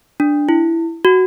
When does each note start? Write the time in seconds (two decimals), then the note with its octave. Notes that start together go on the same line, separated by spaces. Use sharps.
0.20 D4
0.49 E4
1.05 F#4